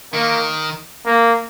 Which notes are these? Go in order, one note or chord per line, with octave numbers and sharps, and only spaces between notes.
D#3 A#3
A#3